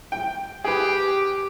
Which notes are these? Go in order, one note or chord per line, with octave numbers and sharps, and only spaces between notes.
G5
G4 G#4 B4